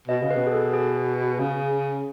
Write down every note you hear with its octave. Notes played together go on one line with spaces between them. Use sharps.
B2 D#5
C#3
B4
B2
G#4
A4
G#4
C#3